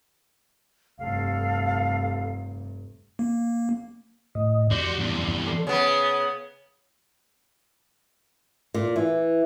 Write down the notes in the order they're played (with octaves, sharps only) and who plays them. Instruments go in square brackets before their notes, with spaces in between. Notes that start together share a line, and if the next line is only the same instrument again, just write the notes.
[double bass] F1 G2 [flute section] A4 F5
[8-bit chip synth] A#3
[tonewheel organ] A2 D#5
[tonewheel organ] F2 D5 C6 [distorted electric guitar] F#4 G4
[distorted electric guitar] E2 G2
[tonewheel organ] A4 D5 C6
[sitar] C#3 B3
[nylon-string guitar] A#2
E3